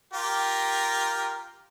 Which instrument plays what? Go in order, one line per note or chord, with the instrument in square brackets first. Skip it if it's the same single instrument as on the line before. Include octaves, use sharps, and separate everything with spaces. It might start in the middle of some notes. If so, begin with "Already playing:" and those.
[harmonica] F4 G4 A#4